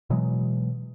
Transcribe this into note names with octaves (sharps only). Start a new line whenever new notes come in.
B2 E3 F#3 G#3